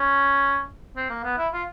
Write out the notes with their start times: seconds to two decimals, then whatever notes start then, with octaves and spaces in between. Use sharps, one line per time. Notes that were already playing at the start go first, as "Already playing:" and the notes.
Already playing: C#4
0.97 C4
1.10 A#3
1.24 B3
1.38 E4
1.53 F4